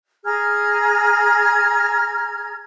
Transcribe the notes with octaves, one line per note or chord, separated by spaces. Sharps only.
G#4 A#5 F6 G#6